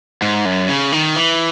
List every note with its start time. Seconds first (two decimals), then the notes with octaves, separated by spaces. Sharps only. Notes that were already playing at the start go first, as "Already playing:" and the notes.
0.22 G#2
0.45 F#2
0.69 C#3
0.92 D#3
1.16 E3